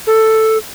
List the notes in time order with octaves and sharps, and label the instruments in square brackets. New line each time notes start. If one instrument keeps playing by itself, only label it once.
[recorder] A4